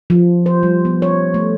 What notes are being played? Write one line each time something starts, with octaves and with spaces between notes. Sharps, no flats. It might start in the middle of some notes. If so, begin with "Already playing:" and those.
F3
C5
G3
B3
C#5
A3